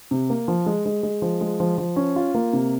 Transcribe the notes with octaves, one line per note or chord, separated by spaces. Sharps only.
C3
A#3
F3
G#3
G#3
G#3
F3
G#3
F3
F3
C#4
F4
A#3
C3